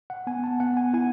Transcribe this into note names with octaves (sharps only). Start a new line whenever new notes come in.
F#5
B3 G#5
A5
B3 F#5
G#5
E4 G#5